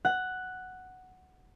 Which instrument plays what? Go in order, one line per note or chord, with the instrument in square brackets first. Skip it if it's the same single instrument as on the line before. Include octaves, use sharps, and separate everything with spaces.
[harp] F#5